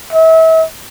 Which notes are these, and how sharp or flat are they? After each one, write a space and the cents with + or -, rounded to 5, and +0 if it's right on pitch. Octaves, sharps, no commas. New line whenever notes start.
E5 -35